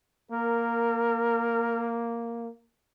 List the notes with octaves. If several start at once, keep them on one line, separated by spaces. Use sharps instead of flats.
A#3 A#4